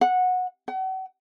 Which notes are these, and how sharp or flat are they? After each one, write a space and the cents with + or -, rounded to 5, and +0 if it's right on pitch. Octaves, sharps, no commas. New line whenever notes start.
F#5 -15
F#5 +40